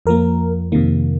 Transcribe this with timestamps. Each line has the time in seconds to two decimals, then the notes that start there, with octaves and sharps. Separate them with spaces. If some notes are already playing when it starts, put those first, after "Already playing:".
0.06 F2 F3 A#3 A#4
0.72 F2 C3 D#3 A#3